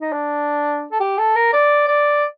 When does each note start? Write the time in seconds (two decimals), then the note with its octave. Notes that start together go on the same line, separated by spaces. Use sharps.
0.01 D#4
0.12 D4
0.92 A4
1.00 G4
1.19 A4
1.36 A#4
1.53 D5
1.88 D5